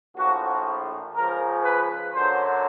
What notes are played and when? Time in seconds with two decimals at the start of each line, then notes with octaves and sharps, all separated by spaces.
0.16 A#1 A2 F3 F#4
1.14 C#2 C#3 F3 A#4
1.64 B4
2.13 F#2 D3 F#3 C5